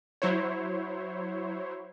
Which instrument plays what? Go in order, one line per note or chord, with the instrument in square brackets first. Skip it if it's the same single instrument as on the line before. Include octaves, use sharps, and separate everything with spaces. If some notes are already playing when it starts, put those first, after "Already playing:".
[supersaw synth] F#3 E4 C5 C#5